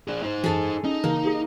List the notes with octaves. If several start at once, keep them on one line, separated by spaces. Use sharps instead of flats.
D4 G#4
D#4 C5
F#2 E3 G#4 A4
C#4 D#4
C#3 E3 A#3
G4 G#4